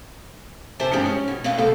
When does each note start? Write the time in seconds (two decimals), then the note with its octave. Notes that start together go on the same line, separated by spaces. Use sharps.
0.80 C3 G4 C5 E5 G#5 A5
0.92 G2 F3 G#3 C#4 D4 G4
1.06 C#4
1.28 B2
1.44 B2 A3 C4 B4 F5
1.58 D2 C3 B3 G4 A4 F5